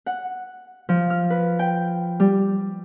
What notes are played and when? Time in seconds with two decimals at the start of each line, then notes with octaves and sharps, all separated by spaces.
0.06 F#5
0.89 F3
1.10 F6
1.30 B4
1.59 G5
2.20 G3